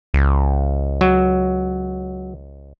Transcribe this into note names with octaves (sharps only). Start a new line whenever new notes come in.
C#2
F#3